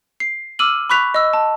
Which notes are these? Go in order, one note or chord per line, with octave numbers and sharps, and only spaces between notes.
C7
D6 E6 F6 D#7 F#7
B5 C#6 F#6 B6 F7
D#5 E6
A5